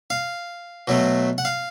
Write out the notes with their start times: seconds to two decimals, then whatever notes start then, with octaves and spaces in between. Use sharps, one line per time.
0.10 F5
0.88 B2 F#3 A3
1.38 F#5
1.45 F5